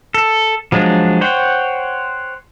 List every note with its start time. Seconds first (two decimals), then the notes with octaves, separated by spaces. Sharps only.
0.14 A4
0.72 F3 F#3 G#3 D4
1.21 C5 C#5 F#5 G5